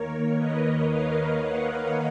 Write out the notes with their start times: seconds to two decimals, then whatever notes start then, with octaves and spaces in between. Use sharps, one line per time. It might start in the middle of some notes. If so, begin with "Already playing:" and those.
Already playing: D#2 D#3 A#3 A#4 C#5
0.35 B4 D#5
0.85 C#5 F5
1.35 D#5 F#5